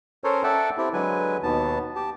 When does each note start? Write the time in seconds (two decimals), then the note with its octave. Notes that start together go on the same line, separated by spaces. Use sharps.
0.24 C#4 A4 A#4 C5 C#5
0.43 A4 D5 E5 F#5 G5 A5
0.78 C4 E4 G4
0.93 D3 F#3 G#3 B4 G#5
1.43 D#2 B2 D#3 B3 A5
1.96 G4 A5